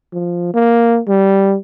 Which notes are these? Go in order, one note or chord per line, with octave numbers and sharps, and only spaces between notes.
F3
A#3
G3